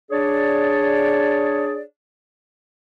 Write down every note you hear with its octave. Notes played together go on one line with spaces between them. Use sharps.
D4 G#4 C#5 D5